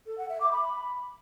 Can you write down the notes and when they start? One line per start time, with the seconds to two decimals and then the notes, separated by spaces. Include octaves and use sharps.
0.06 A4
0.18 F#5
0.29 E5
0.41 D6
0.52 B5